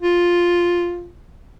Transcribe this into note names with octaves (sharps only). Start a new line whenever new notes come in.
F4